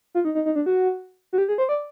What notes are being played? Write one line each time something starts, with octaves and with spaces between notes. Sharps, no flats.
F4
D#4
D#4
D#4
D4
F#4
F#4
G4
G#4
C5
D5